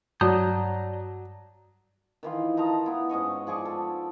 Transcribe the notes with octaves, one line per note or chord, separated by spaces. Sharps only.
G2 F#3 D5 A5 A#5 D#6 G6
D#3 E3 F4
D#4 F4 A5 A#5
B3 E4
G#2 C#4 D#5 C#6
F3 G#4 D5 C#6
A4